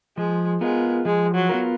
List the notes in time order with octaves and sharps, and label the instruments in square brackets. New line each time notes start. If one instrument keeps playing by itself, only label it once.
[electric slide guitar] F3 [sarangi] G#3
[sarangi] G#3 [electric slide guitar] B3 F4 A#4
[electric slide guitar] F3 [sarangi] G#3
[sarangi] F#3
[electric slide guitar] B3 F4 A#4